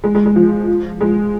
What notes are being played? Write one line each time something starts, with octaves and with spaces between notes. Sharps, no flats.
G#3
G#3
G#3
F3
G#3